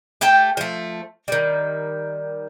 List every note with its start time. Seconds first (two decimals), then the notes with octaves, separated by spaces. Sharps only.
0.21 A3 G4 G5 A5
0.57 F3 A3
1.28 D#3 G3